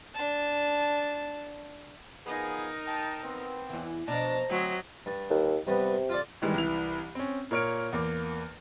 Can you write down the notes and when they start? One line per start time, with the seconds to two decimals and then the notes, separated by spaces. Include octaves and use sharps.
0.14 D4 A5
2.26 F3 B3 D#4 G#4 A#4
2.86 G5 A5
3.23 B3 C4
3.70 E2 E3
4.08 B2 F3 D4 A5 A#5
4.50 D2 F#3 C4 D#5
5.06 G2
5.30 D#2
5.67 G2 C3 B3
6.09 F4 A4 D5
6.42 D#3 E3 G3 G#3
6.54 C2 E3 E4 F7
7.15 C4 C#4
7.51 A#2 A#4 C#5 F6 D7
7.93 E2 A#3 D6